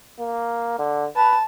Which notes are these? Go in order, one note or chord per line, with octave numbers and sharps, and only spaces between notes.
A#3
D3
B4 A5